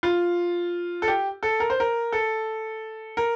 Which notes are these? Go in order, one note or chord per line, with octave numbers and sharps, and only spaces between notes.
F4
A4
G4
A4
A#4
C5
A#4
A4
A#4